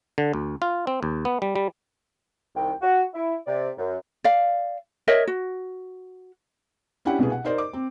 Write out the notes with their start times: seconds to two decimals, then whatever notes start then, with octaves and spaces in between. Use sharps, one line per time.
0.18 D3
0.33 D2
0.62 F4
0.87 C4
1.03 D#2
1.25 B3
1.42 G3
1.56 G3
2.55 C2 D#3 G5
2.82 F#4
3.14 E4
3.47 C3 D5
3.78 F#2
4.24 D5 F5
5.08 A#4 C#5 D#5 E5
5.27 F#4
7.05 C#4 D4 E4 G4 F#5
7.18 C2 B2 B3 G#4
7.32 F#5
7.44 D#4 A#4 C5 D5 D#5
7.58 D6
7.73 C4